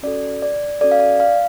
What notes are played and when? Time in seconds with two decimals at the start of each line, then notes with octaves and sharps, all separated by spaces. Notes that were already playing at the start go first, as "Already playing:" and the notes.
0.03 C#4 F#4 A4 D5
0.42 D5
0.81 C#4 F#4 A4 D5
0.91 F5
1.00 D5
1.20 F5